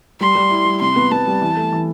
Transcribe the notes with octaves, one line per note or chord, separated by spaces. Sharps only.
G3 C6
G3
E4
G3
C3 C6
B3
B3 A5
G3
E3
A3
E3